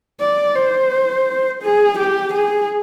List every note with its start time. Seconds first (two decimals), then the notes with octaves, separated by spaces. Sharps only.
0.21 D5
0.56 C5
1.63 G#4
1.98 G4
2.34 G#4